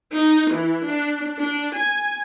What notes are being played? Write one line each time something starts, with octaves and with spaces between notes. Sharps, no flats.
D#4
E3
D4
D4
G#5